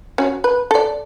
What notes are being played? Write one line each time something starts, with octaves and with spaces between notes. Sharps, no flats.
C#4 F#4
B4
A4 D5